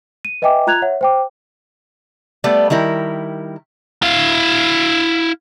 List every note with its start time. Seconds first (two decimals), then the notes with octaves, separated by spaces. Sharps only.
0.25 D#7
0.42 B4 D#5 E5 G5 G#5 D6
0.67 F4 A#5 F#6 G#6 F7
0.82 C#5 E5 F#5
1.01 C5 G5 D6
2.44 G3 A3 B3 D5
2.70 D#3 G3 E4 A#4
4.02 E4 F5